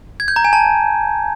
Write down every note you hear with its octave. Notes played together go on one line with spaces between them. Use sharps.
G#6
G6
A#5
G#5
A5